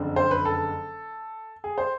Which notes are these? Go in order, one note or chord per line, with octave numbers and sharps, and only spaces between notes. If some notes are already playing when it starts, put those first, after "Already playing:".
Already playing: F#1 F2 D3
C5
B4
A4
G#4
C5